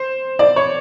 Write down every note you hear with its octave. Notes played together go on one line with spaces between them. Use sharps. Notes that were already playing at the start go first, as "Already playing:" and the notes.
Already playing: C5
D5
C#5